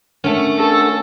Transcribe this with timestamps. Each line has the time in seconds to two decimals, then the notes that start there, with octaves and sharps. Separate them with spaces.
0.24 A3 C#4 D4 A#4 F#5
0.58 A4